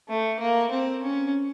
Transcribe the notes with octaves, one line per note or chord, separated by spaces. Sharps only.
A3
A#3
C4
C#4